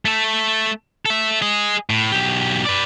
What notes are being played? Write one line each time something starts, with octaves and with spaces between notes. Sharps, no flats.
A3 A4
A4 E5
G#4 D#5
A2
B1 G4
B4 D5